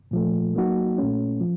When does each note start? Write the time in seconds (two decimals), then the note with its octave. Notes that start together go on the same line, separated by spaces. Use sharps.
0.11 A#2 F3 A3
0.55 F#3 A#3 D#4 F#4
0.98 A#2 A3 C#4
1.41 F3